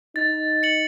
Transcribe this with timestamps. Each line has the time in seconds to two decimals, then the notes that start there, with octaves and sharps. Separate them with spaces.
0.16 D#4 A6
0.63 C#7 F#7